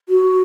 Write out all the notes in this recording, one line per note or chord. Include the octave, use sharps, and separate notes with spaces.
F#4